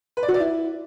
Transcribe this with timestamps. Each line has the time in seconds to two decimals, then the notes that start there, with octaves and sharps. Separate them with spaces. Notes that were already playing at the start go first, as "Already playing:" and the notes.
0.17 B4
0.23 D5
0.28 F#4
0.34 D5
0.40 E4